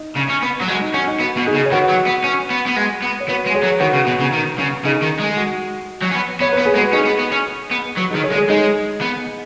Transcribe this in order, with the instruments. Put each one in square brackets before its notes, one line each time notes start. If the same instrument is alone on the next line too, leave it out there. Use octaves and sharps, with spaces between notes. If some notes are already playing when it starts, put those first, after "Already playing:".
Already playing: [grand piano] D#4
[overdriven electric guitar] C#3
C#4
B3
F#3
[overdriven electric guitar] G#3 [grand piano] F#4
[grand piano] D#4
[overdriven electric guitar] C#4 [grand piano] F#4
[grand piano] D#4
[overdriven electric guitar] B3 [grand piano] F#4
[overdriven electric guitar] B2
[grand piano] D#4 G#4
[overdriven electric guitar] C#3
[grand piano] C#5
[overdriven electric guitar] D#3 [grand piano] F#4 B4
[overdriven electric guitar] F#3
B3
C#4
B3
B3
G#3
B3
[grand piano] C#5
[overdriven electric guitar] B3 [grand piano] F#4 B4
[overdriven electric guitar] G#3
[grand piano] G#4 C#5
[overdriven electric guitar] F#3
[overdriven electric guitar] D#3 [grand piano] F#4 B4
[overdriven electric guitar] C#3
B2
C#3
D#3
C#3
[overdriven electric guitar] C#3 [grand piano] D#4 G#4
[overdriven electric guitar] D#3
G#3
[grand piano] G#4
F#4
[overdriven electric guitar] F#3
C#4
B3
[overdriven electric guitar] B3 [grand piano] C#5
[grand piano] B4
[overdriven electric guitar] B3
[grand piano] G#4
[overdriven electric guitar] G#3 [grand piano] F#4 B4
[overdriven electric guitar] C#4 [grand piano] D#4 G#4
[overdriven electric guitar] B3
B3
C#4
B3
[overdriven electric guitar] F#3 [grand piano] F#4 B4
[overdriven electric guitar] D#3 [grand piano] D#4 G#4
[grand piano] G#4 C#5
[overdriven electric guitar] G#3
[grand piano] G#4 C#5
[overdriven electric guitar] G#3 [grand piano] D#4 G#4
[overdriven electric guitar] B3